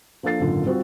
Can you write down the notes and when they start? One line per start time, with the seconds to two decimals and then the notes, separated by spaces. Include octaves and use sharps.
0.23 F3 A#3 D4 A4 A6 C7
0.39 G#1 F#2 A#2 D3
0.66 G3 C4 F4 F#4 C5